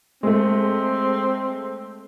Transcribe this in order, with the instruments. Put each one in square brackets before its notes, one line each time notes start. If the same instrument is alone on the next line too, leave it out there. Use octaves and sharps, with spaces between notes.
[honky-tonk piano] G#3 A3 [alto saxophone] C4